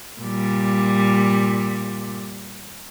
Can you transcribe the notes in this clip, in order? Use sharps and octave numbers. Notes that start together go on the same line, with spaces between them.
A#2 G3